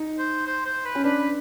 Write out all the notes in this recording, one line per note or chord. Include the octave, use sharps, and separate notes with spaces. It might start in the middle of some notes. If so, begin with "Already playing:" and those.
Already playing: D#4
C5
C5
C5
B4
C#4
D4 B4